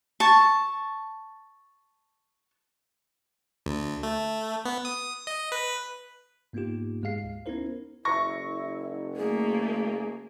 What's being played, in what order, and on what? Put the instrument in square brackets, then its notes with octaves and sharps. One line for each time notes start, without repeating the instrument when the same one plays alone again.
[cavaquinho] A5 C#6
[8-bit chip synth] D2
A3
B3
D#6
D#5
B4
[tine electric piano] G#2 A#3 B3 D#4 F4 G4
G#2 G#3 G#4 F5 C7
D2
B3 C#4 D#4 E4 A#4 C5
[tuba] F#1 [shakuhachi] E4 [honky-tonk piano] C#6 A#6
[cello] A3 A#3 [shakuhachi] G#4